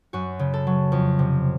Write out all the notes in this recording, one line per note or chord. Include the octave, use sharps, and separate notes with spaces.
F#2 F#4
C#3
A4
F#3
F2
C3